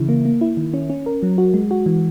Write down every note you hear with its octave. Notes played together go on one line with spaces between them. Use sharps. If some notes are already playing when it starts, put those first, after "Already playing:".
Already playing: C#3 E3 E4
A#3
A#3
E4
D#3
C#4
C#4
A#4
F#3
F#4
G#3
F#4
E3